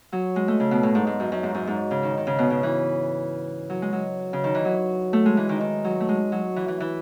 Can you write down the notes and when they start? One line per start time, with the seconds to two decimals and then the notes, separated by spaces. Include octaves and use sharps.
0.12 F#3
0.36 G#3
0.48 A3
0.60 C#3
0.71 B2
0.83 A2
0.95 G#2
1.07 G#2
1.20 F#2
1.32 F#2
1.43 G#2
1.55 F#2
1.67 G#2
1.91 C#3
2.03 D#3
2.17 D#3
2.27 C#3
2.38 B2
2.50 C#3
2.63 E3
3.70 F#3
3.82 G#3
3.93 F#3
4.33 C#3
4.44 D#3
4.55 E3
4.65 F#3
5.13 A3
5.26 G#3
5.37 E3
5.49 D#3
5.61 D#3
5.84 F#3
6.00 A3
6.09 G#3
6.32 F#3
6.56 E3
6.68 E3
6.80 E3